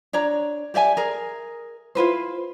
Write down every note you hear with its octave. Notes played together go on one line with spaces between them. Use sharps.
D4 C#5 D5 A#5
G4 D5 E5 G#5
G#4 A#4
E4 F4 B4 C5